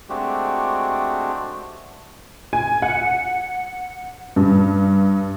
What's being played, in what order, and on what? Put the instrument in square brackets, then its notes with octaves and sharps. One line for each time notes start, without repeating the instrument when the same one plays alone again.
[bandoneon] G#3 A3 C4 D4 F#4 G4
[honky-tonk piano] G#5
F#5
G2